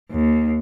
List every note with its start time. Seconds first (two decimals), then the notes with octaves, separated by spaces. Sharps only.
0.11 D#2